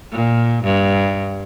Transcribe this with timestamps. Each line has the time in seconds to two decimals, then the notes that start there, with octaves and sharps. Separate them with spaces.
0.12 A#2
0.64 G2